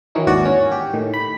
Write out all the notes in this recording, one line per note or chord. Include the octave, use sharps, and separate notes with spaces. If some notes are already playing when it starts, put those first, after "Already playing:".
D#3 E3 F#3 C#4 D#4
G#1 D#2 F#4 D5
C#4
G4
A2 D#3
B5